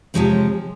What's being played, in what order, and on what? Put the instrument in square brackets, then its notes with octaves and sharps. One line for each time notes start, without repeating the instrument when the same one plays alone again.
[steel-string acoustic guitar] C3 F3 G#3 C4 C#5